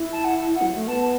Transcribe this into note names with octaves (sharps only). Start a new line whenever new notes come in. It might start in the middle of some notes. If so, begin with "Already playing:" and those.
Already playing: E4
A5
F#5
F#5
F#3
A3
B3 A5